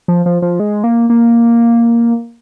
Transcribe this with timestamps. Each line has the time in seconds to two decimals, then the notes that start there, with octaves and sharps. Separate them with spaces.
0.08 F3
0.26 F3
0.42 F3
0.60 G#3
0.84 A#3
1.10 A#3